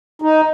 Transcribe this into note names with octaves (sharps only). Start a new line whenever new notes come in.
D#4